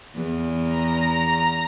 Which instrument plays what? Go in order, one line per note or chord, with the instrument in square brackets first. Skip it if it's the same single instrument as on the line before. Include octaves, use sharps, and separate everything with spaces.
[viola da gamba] E2
[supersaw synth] A#5